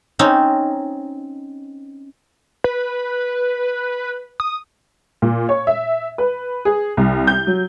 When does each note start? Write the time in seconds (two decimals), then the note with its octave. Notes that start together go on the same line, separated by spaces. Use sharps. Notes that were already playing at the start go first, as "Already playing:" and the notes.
0.19 C4 C#4 D#4
2.64 B4
4.40 D#6
5.22 A#2
5.49 C#5
5.67 E5
6.18 B4
6.65 G#4
6.97 C2
7.27 G6
7.47 F#3